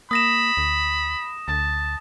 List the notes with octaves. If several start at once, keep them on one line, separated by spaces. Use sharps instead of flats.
A#3 B5 D#6 A#6 E7
D2
D2 A5